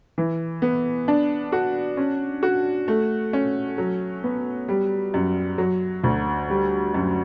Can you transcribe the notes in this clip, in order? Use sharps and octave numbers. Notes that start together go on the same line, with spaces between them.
E3
B3
D4
F#4
C#4
F#4
A3
C#4
F#3
B3
G3
F#2
F#3
D2
G3
F#2